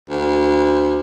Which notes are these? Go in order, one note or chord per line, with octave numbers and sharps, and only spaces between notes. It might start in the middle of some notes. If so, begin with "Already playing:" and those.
D2